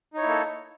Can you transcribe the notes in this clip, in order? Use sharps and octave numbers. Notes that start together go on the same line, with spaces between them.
A#3 D#4 E4 A4 C#5